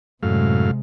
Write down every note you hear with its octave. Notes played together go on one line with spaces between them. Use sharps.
F#2 A2 C3 G#3 F5